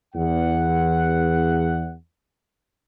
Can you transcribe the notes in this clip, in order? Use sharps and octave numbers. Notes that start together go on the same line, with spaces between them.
E2 F#5